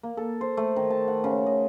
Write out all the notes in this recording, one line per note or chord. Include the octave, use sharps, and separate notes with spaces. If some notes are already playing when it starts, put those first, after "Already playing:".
A#3
A4
C5
A3
D#3
A5
F#5
C#3
D#5